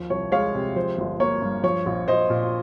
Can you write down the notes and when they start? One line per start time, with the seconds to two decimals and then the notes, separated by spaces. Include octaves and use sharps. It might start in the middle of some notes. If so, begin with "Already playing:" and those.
Already playing: D#2 F3
0.10 C2 C#5
0.32 G#3 C#5 F5
0.54 C3
0.76 F3 C5
0.98 G1
1.20 A#3 C#5
1.42 G2
1.63 F3 C#5
1.86 A#1
2.08 A#1 C5 D#5
2.30 A#2